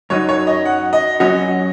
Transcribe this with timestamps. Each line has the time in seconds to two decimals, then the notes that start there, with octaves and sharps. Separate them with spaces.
0.10 F#2 F#3 D#4 C#5
0.29 C#5
0.47 D#5
0.65 F#5
0.93 D#5
1.20 F#2 F#3 C#4 F#4 D#5